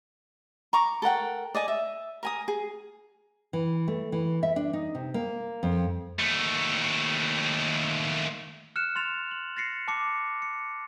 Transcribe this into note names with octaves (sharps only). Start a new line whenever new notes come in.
A#5 C#6 D6
A4 A#4 F#5 G5
D5 D#5 G#5
E5
A#4 G#5 D#6
G#4
E3
A3
E3
E5
D4
D#4
C3
A#3
F2
D#2 A3
F6 F#6 C#7 E7
C6 A6 F7
F#7
A6 A#6 C7 C#7
A5 D6 C#7
C#7